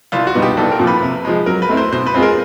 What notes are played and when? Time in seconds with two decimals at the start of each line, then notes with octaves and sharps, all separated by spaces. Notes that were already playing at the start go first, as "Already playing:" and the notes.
0.12 C2 F4
0.27 F#4
0.34 B2 G3 B3 D#4
0.42 G4
0.57 C2 A4
0.72 A#4
0.79 A#2 F3
0.87 B4
1.02 C3
1.25 F3 G#3
1.46 F#3 A#4
1.62 B4
1.69 A3 C4 E4
1.77 C5
1.92 B2 C5
2.06 B4
2.14 G#3 C4 F4 G#4
2.22 A#4